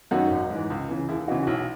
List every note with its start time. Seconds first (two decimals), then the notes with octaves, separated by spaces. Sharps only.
0.11 F#2 D#3 D#4 F#4
0.30 G#1
0.50 G#2 E3
0.70 C#2
0.88 C#3 E3
1.09 D#2 E4 G#4
1.28 C#3 E3 D#4 F#4
1.42 F#4
1.47 B1 C#4 E4